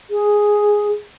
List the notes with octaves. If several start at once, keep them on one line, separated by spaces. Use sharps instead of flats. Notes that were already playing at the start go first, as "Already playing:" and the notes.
G#4